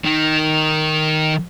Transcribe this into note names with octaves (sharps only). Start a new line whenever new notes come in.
D#3